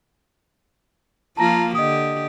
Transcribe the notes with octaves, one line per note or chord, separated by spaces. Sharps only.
F3 A#3 F4 A5 A#5 A#6
D3 G4 D#5 D#6